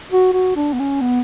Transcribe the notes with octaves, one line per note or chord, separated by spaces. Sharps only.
F#4
F#4
D4
B3
C#4
B3